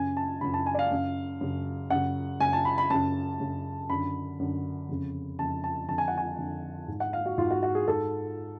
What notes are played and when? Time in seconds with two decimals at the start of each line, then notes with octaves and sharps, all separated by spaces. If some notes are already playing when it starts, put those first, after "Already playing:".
Already playing: F#2 C#3 G#5
0.17 A5
0.41 F#2 C#3 B5
0.54 A5
0.66 G#5
0.74 D5
0.79 F5
0.91 F#2 C#3
1.41 F#2 C#3
1.90 F#2 C#3 F#5
2.40 F#2 C#3 G#5
2.53 A5
2.65 B5
2.78 B5
2.90 F#2 C#3 A5
3.40 F#2 C#3
3.90 F#2 D3 B5
4.39 F#2 D3
4.89 F2 C#3
5.39 F2 C#3 A5
5.64 A5
5.88 F2 D3 A5
5.98 G#5
6.08 F#5
6.17 G#5
6.38 F2 D3
6.88 G#2
7.00 F#5
7.13 F5
7.26 F#4
7.38 G#2 F4
7.51 F#4
7.63 F#4
7.75 G#4
7.88 G#2 A4